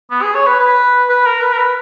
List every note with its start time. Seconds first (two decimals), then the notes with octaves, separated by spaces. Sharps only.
0.11 B3
0.22 G#4
0.35 C#5
0.47 B4
0.59 B4
1.09 B4
1.25 A#4
1.42 B4
1.52 A#4
1.58 B4